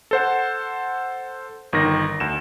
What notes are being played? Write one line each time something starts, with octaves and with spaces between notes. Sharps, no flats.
A4 C5 F#5
G1 D#3 A#6
D2 E7